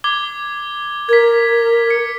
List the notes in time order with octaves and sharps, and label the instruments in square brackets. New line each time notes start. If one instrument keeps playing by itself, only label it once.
[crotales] D6 G#6 G7
[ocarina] A#4 [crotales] G#6 B6
[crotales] C#7